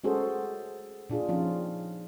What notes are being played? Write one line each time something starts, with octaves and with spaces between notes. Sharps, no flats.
G#3 C#4 F#4 G#4 A4 C5
A#2 D4 F4 G#4
F3 C4 C#4 D#4 F4